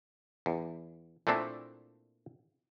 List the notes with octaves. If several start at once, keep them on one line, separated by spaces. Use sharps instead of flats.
E2
A#2 A3 A#3 C4 D4 E4